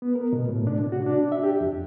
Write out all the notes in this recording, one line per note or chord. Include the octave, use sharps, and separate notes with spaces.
B3
A#4
B2
A2
D4
C3
F#4
D4
E5
G4
F2